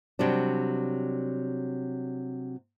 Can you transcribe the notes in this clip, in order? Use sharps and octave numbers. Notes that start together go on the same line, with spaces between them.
C3 F#3 G3 D4